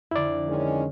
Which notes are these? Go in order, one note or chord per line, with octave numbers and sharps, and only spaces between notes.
F2 D3 E4 D5
D#3 G#3 C#4